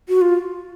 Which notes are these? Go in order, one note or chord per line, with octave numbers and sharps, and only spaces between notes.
F#4
F4